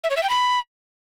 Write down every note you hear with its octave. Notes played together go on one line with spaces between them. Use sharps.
E5
C#5
E5
G5
B5